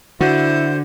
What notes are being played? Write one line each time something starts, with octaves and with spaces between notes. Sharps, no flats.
D3 E4 F#4 C5